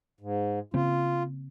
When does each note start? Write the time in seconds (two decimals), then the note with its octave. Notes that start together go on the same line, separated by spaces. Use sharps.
0.20 G#2
0.74 C#3 A#3 C4 F4